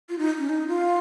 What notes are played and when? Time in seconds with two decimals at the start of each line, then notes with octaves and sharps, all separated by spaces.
0.09 F4
0.18 D#4
0.39 C#4
0.49 D#4
0.68 F4